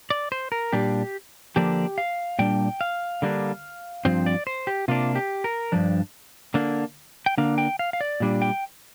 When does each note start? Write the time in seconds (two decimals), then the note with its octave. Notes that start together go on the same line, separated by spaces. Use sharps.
0.10 D5
0.32 C5
0.52 A#4
0.72 A#2 G3 D4 G4
1.56 D3 F3 A#3 D4 G4
1.98 F5
2.39 A#2 G3 D4 G5
2.81 F5
3.22 D3 G3 A#3 D4
4.05 G2 F3 C4 C5
4.26 D5
4.47 C5
4.67 G4
4.88 C3 A#3 D4 F4
5.15 G4
5.44 A#4
5.72 G2 F3 D4
6.54 D3 A#3 D4
7.26 G5
7.38 D3 A#3 D4 F5
7.58 G5
7.79 F5
7.93 F5
8.01 D5
8.20 A#2 G3 D4
8.42 G5